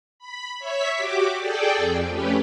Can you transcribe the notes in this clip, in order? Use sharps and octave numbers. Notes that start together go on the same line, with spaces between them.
B5
C#5 E5 B6
F#4 G4 D6
G#4 A4 D5 G5
F2
A3 C#4 G4 B4